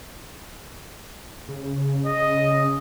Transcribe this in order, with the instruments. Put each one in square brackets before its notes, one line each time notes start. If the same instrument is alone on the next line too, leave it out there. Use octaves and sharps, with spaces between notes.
[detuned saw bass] C#3
[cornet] D#5